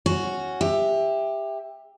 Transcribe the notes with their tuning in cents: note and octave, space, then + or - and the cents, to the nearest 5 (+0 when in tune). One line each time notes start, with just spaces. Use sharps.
C#4 +0 F#4 +0
G4 +20 E5 +0